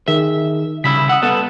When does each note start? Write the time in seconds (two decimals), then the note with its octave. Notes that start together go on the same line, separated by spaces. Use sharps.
0.08 D#3 G#4 E5
0.84 C#3 G3 E4 E6 B6
1.09 F#5 D#6 E6
1.22 G3 B3 A4